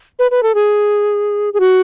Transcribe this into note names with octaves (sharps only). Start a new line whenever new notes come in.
B4
B4
A4
G#4
G#4
F#4